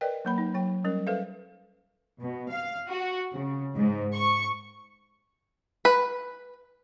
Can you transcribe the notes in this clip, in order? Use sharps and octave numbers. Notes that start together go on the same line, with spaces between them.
A#4 B4 D5 D#5 G5
F#3 A#3 B5
D#4
F#3 G5
G3 C#4 A#4
A4 B4 C5 E5 F5
B2
F5
F#4
C#3
G#2
C#6
B4